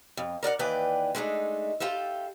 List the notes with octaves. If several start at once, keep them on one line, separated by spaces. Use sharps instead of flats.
F2
A#4 D5 F5 F#5
D#2 E3 B4 D5 G5 G#5
G#3 A3 D4 D#4
F4 G4 A4 E5